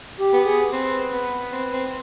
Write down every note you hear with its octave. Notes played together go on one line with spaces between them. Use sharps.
G4
B3
G#4
C4 B4
B3
C4
C4